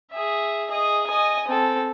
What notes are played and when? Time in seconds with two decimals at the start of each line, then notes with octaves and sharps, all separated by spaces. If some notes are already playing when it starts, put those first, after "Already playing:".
0.12 G#4 E5
0.70 G#4 D#5
1.07 D#5 G#5
1.48 C4 A4